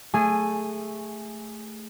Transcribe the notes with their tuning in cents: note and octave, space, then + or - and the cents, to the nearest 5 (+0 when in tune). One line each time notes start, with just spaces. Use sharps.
A3 +0 G#4 -20 G#5 +0